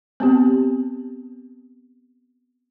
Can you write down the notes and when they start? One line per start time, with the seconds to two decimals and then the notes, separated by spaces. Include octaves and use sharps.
0.20 B3 C4 G4